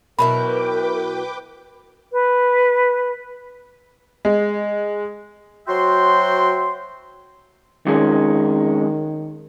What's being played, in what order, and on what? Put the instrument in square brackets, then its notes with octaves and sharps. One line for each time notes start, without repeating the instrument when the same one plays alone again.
[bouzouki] B2 F#3 E4 [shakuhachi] A#4 [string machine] B4 G5 D6 [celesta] B5
[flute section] B4
[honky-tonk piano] G#3
[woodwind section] F#3 F#4 C5 E5 G5 C6
[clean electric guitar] F2 G#3 C#4 [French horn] D#3